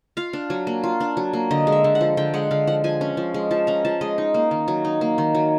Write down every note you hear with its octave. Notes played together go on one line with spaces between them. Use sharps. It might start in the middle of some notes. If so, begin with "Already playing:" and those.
F4 F5
D4
F#3
A#3
F4
D4
F#3
A#3
D3 D#5
G#3
E5
D3
F#5
F3
D3 G5
G#3 F#5
D3 F5
F3 F#5
F3 G#5
C#4
F3
G#3
F3 A5
C#4 A#5
F3 A5
G#3 D#5
D#4
A#3
D#3
F#3
D#4
A#3
D#3
F#3